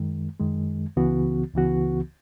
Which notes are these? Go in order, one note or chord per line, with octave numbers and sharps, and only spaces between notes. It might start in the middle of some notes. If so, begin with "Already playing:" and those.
Already playing: F#2 D#3 G#3
F#2 D#3 G#3
C#2 C#3 E3 B3 F#4
C#2 C#3 E3 B3 F#4